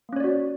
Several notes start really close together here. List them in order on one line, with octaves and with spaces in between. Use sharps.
A#3 C#4 C#5 D5 F#4